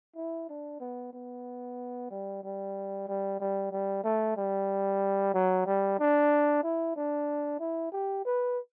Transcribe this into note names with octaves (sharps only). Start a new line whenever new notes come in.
E4
D4
B3
B3
G3
G3
G3
G3
G3
A3
G3
F#3
G3
D4
E4
D4
E4
G4
B4